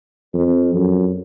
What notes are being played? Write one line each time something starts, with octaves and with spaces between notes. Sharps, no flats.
F2
F#2